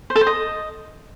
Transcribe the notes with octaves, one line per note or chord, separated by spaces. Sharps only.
C5
A4
C5
D#5